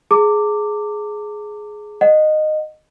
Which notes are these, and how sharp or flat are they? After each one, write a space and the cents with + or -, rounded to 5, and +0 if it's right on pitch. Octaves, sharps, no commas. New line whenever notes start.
G#4 +15 A#5 -45 D6 +0
D#5 -15 F#5 -10